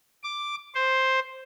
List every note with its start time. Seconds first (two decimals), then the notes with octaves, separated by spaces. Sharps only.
0.24 D6
0.75 C5